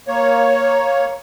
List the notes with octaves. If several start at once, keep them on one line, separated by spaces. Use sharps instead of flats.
A#3 C#5